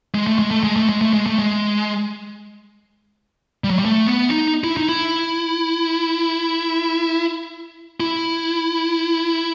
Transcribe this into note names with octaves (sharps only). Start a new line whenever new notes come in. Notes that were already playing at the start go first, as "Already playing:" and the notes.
G#3
A3
G#3
A3
G#3
A3
G#3
A3
G#3
A3
G#3
G3
F#3
G3
A3
B3
D#4
E4
D#4
E4
E4